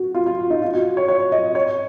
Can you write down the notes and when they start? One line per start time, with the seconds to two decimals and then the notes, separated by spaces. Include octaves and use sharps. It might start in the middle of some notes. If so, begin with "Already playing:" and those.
Already playing: F#4
0.15 F4
0.26 F4
0.50 D#4
0.62 F4
0.74 F#4
0.97 C#5
1.08 C#5
1.32 D#5
1.55 C#5